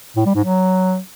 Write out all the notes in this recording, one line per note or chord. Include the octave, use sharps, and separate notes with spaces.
A2
G3
G#2
F#3